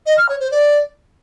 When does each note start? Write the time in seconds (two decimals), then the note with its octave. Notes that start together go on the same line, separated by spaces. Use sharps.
0.06 D#5
0.18 F6
0.29 C#5
0.40 C5
0.51 D5